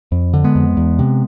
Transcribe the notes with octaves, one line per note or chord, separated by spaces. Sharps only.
F2
D3
G#3 B3
F2
E2
C3